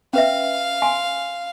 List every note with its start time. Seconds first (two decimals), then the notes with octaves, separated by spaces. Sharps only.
0.13 C#4 B4 E5 F5
0.82 G#5 C6